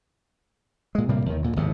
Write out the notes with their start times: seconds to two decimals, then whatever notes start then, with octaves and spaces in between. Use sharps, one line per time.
0.95 A#2 G#3
1.09 A2 C3 G3 A#3
1.26 D#2 D#3
1.42 D2 A#2
1.56 G#1 D#2 A2 C3